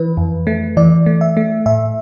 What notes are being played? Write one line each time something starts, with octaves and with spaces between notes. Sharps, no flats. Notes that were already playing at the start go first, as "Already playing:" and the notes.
Already playing: E3 B4
F2
A3
E3 D5
A3
E5
A3
A2 E5